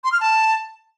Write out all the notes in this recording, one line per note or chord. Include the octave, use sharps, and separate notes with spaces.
C6
F6
A5